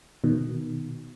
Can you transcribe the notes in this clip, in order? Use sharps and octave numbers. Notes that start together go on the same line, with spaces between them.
B2 D#3